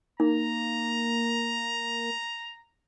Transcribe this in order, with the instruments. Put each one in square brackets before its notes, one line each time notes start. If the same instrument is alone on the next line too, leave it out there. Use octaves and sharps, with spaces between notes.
[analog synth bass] A#3 [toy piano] D#4 [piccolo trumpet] A#5